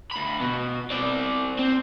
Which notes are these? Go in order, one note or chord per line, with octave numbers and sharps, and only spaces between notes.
D2 B5
B2 B3
C4 D5
C4